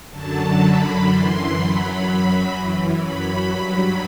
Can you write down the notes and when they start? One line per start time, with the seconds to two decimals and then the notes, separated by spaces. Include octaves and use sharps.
0.11 F#2 D3 F#3 A5
0.59 F#2 D3 F#3 B5
1.07 F#2 E3 C6
1.55 F#2 F#3 B5
2.03 F#2 F#3 B5
2.52 F#2 E3
3.00 F#2 F#3 B5
3.48 G2 F#3 B5